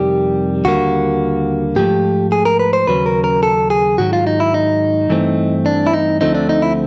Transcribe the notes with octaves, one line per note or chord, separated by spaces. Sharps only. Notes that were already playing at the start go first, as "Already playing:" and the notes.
Already playing: F2 C3 D#3 G3 G4
D#2 D3 G3 A#3 F#4
G#2 F3 A3 G4
G#4
A#4
B4
C5
D#2 C#3 F#3 C#4 B4
A#4
A#4
A4
G#4
G#2 D#3 F#3 F#4
F4
D#4
E4
D#4
G2 E3 A3 C4
D4
E4
D#4
D2 D3 F3 A3 C4 D#4
D4
D#4
E4